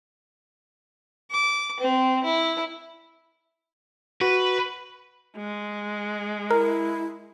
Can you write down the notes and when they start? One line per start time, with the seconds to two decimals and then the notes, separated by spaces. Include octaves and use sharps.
1.31 D6
1.80 C4
2.24 E4
4.21 F#4 B4
5.37 G#3
6.50 E4 A#4